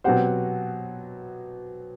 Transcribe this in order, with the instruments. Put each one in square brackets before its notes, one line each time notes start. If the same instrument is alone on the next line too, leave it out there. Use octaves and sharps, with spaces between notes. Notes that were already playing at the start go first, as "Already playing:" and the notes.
[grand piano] B2 F#3 C4 G4 C5 [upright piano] F#5